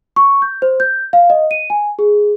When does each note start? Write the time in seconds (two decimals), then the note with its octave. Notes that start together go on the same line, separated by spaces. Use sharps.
0.16 C#6
0.42 G6
0.62 C5
0.80 G6
1.13 F5
1.30 D#5
1.51 D#7
1.70 G#5
1.99 G#4